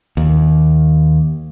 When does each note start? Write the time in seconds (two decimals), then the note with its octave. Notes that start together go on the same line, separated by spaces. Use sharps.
0.17 D#2